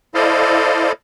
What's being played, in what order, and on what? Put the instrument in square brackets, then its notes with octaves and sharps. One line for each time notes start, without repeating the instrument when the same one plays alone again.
[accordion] E4 A4 C5 D5 D#5 F5